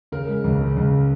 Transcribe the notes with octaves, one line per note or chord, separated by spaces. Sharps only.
C#3 A#4
G#3
C#2
C#3
C#2